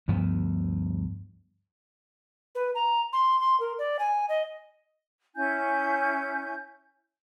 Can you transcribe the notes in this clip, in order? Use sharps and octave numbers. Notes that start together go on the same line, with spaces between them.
D2 G2 F3 B3
B4
A#5
C6
C6
A#4
D5
G#5
D#5
C#4 E4 G#5 G6